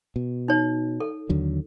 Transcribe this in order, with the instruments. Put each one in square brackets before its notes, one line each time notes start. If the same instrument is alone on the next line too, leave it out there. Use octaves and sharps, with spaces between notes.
[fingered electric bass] B2
[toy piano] D#4 C#5
A4
[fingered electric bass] D#2 D3 F#3